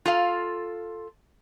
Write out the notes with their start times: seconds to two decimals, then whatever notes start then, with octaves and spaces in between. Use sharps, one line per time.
0.06 F4 A4 F5